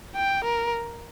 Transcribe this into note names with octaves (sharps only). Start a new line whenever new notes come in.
G5
A#4